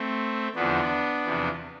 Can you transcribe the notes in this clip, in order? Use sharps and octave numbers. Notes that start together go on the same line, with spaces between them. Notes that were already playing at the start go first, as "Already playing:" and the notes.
Already playing: A3 C4
E2 D3 F3 B3 D4
E2 C3 F3